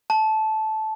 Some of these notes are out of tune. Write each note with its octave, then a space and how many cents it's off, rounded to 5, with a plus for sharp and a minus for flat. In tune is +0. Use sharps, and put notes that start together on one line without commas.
A5 -15